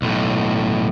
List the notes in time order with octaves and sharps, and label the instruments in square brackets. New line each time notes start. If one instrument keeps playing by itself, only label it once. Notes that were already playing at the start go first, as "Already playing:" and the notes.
[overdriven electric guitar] B1 A2